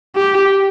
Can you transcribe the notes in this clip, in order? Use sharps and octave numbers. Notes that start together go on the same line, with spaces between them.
G4